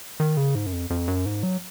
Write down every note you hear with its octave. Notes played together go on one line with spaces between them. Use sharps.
D#3
C#3
G#2
F#2
F2
F2
F#2
G#2
F#3